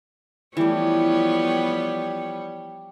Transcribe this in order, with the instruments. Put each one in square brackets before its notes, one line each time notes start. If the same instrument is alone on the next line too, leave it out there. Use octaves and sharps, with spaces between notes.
[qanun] E3 A3 [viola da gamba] F3 B3 C#5 [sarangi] G3